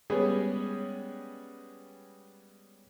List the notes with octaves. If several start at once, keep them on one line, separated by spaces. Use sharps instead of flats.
G3 G#3 B3 C#4 G#4